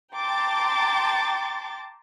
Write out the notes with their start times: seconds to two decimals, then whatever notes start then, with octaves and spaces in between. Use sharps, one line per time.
0.14 G5 A5 A#5 C6 D6 A6